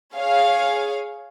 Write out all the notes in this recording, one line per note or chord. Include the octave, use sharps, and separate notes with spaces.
G#4 C#5 F5